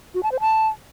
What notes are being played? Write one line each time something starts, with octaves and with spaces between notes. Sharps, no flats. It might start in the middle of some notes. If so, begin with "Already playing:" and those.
F#4
A5
C5
A5